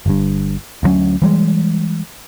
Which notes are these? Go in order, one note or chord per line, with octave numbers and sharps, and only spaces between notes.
G1 G2
D2 G2 F#3 C#4
E3 G3 G#3